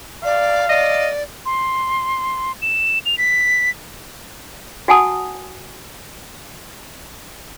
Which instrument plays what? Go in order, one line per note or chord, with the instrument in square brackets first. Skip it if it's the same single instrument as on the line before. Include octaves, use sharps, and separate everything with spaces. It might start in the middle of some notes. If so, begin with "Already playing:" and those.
[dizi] D5 [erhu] F5
[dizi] D5 [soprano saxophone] D#5
[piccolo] C6
E7
F7
B6
[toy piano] F#4 F#5 G#5 A5 D#6